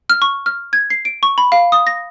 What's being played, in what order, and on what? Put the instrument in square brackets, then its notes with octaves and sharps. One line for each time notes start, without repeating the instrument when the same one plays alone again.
[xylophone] F6
C#6
F6
G#6
C7
D7
C#6
B5
F5
D#6
A#6